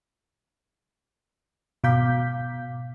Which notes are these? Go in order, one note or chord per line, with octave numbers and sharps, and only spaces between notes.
G#2 B2 F5 D6 G6 B6